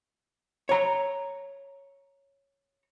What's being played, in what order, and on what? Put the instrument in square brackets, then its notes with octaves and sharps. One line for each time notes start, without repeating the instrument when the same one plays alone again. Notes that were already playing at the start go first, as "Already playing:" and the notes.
[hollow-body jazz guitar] C#5 A#5